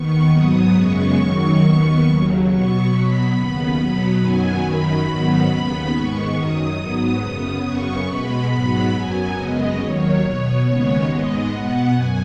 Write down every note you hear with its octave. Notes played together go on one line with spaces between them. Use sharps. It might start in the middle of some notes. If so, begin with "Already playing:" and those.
Already playing: D#2 D#3 B3 C#6
G#2 F#3 B3 D#6
F#2 C#3 G#3 B3 C#6
F#2 D#3 F#3
D#2 D#3 B3
D#2 C#3 F#3
B2 F#3 B3 C#6
B2 F#3 B3 B5
D#2 C#3 B3
B2 F#3 B3
F#2 D#3 F#3 B3 G#5
F#2 D#3 F#3 B5
G#2 D#3 F#3 B3
D#2 C#3 B3
G#2 D#3 G#3 B3 C#6
F#2 D#3 F#3 D#6
G#2 F#3 B3
F#2 C#3 B3
F#2 C#3 B3 C#6
B2 G#3 B3 B5
G#2 F#3 B3 B5
F#2 F#3 B3 G#5
F#2 C#3 G#3 B3 D#5
D#2 D#3 F#3 C#5
B2 B3
D#2 C#3 G#3 B3 C#5
G#2 G#3 B3 D#5
B2 B3 F#5
F#2 G#5